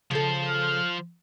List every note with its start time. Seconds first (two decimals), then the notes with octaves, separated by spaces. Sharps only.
0.11 C#3 F3 A4 C5
0.47 F6